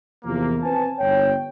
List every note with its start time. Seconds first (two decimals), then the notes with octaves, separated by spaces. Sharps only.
0.24 E2 C3 F3 A#3
0.62 C4 B4 C5 G#5 A5
0.99 G1 C#5 G5